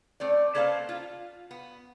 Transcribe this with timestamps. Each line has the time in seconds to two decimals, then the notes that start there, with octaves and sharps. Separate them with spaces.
0.20 A3 C4 D5
0.55 A#3 A4 B4 C5 F5
0.89 F4
1.51 B3